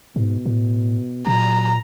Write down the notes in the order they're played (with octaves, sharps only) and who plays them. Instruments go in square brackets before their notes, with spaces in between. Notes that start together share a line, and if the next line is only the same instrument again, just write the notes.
[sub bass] G#2 [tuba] B2
[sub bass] A2
[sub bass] A#2 [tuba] F#3 [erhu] A#5